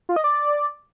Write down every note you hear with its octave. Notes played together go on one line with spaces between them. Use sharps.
F4
D#5
D5